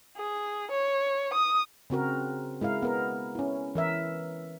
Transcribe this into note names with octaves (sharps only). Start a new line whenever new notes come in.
G#4
C#5
D#6
C#3 C4 F#4 A#4
G#3 E4 A#4 F5
B3 A#4
C#4 E4
E3 A#4 E5